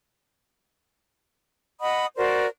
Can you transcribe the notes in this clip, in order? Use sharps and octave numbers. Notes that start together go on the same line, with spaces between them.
D#5 F#5 B5 D#6
F#4 A#4 C5 D5